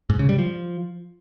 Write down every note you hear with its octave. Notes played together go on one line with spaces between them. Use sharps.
G#2
C#3
G3
F3